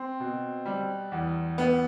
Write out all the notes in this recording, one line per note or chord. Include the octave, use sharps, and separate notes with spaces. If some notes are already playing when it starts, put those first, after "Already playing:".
Already playing: C4
B2
G3
E2
B3